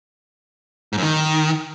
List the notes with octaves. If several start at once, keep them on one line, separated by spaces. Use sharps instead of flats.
G#2
F#2
D#3